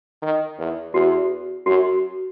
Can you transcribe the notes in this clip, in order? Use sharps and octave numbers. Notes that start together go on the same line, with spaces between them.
D#3
E2
E2 F#4
F#2 F#4